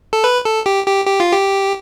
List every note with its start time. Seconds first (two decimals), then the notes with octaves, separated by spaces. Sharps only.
0.13 A4
0.24 B4
0.45 A4
0.66 G4
0.87 G4
1.07 G4
1.20 F4
1.32 G4